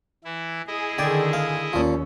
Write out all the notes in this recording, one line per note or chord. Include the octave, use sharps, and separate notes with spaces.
E3 E4
E4 G#4 D#5
D3 D#3 D5 G5 G#5
F5
D#2 A#2 F3 C#4